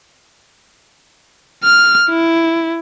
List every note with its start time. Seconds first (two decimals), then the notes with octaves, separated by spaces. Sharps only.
1.64 F6
2.10 E4